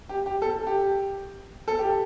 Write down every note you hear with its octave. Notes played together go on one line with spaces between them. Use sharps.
G4
G4
A4
G4
A4
G4